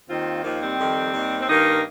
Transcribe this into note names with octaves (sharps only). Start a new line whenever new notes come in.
D#2 D#3 C4 F4
D#2 D#3 F3 A#3
G3 C4
F2 D#3
D#2 D#3
C4
G2 D#3 A#3 D#4